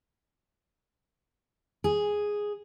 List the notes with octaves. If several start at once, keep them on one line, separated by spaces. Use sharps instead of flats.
G#4